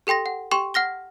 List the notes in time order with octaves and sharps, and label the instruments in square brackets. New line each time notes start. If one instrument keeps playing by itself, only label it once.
[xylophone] G4 A4 G5 C6 A#6
F#5
G4 G5 C6 C#6 E7
F#5 F6 A#6 G7